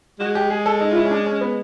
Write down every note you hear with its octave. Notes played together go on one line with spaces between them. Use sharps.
G#3 F#4
G4
G#4
A4
D#4
F4
E4
C#4
D4
C#4
B3